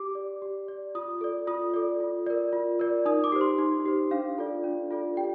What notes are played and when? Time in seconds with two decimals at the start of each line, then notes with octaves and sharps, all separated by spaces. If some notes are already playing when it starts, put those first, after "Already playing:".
Already playing: G4 D6
0.15 D5
0.42 G4
0.68 D5
0.95 F4 D#6
1.21 A4 D5
1.47 F4 D#6
1.74 A4 D5
2.00 F4
2.26 A#4 D5
2.53 F4
2.79 A#4 D5
3.05 D#4 D#6
3.24 D6
3.32 G4 C5
3.41 C6
3.58 D#4
3.85 G4 C5
4.11 D4 F5
4.38 F4 A4 D5
4.64 D4
4.91 F4 A4 D5
5.17 G4 G5